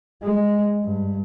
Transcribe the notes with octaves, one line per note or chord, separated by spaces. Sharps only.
G#3
G2